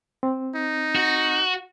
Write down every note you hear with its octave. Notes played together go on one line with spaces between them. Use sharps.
C4
D#4
F#4